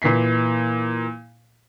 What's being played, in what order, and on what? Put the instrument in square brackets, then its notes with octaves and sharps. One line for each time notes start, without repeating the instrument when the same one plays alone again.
[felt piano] A#2 E3 B6 C7